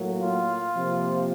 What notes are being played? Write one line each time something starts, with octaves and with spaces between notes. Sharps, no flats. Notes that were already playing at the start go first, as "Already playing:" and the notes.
Already playing: A2 F#3 A#3
F4
C3 F3 A#3